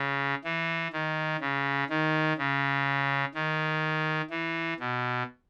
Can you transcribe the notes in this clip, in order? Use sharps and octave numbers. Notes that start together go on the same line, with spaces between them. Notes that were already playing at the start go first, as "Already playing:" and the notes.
Already playing: C#3
E3
D#3
C#3
D#3
C#3
D#3
E3
B2